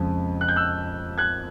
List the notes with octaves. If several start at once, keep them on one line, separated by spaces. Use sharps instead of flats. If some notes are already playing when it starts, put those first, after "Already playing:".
Already playing: F2 C#3 F3 G#3
F#6
G6
E6 F#6
F#6 G#6